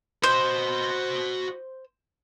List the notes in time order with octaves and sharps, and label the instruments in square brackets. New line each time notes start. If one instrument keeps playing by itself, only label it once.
[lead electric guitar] F#4 D#5 [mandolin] C5